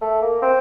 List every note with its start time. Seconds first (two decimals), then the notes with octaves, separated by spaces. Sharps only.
0.01 A3
0.22 A#3
0.42 C4